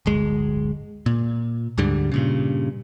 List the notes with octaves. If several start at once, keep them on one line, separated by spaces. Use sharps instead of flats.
D1 G1 G#3
A#2
D2 G#2 D3 G3
G2 A#2 C#3